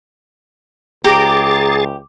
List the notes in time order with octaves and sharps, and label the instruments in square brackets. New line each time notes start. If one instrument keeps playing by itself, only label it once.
[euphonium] C#2 [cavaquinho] G4 [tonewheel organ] G#4 A6 [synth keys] A#5 D6